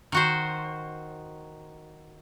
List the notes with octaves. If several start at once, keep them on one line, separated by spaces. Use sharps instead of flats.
D#3 F#4 C5